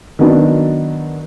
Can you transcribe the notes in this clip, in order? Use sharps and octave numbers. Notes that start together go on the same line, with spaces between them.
D#3 F#3 B3 D4